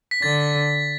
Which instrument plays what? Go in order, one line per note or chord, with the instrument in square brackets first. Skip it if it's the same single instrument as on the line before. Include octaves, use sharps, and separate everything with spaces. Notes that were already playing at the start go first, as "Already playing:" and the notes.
[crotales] B6
[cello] D3 [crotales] A6